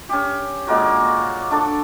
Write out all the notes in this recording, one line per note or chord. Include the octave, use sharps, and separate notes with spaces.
C#4 G4
A#2 G#3 A#3 F#4
D4 A4 A5